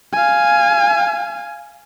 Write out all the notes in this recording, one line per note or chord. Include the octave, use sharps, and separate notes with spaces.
F5 G#5